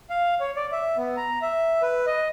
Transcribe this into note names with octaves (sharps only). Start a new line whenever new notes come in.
F5
C#5
D5
E5
B3
A#5
E5
B4
D#5